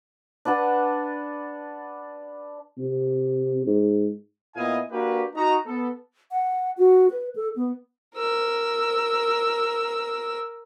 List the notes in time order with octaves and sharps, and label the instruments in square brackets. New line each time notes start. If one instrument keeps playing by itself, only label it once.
[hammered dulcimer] D4 B4 F#5 A5
[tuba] C3
G#2
[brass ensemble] A#2 B3 E4 D#5 F5 G#5
A#3 D4 F#4 G4 B4
D#4 F#4 A#5
B3 A4
[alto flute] F#5
F#4
B4
A4
B3
[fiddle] A#4 E6